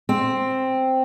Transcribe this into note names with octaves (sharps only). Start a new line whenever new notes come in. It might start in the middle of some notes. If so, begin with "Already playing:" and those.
C4